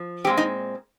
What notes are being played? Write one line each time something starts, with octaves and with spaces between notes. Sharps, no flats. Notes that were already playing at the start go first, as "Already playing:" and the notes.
Already playing: F3
A#2 G#3 C4 G4
D#4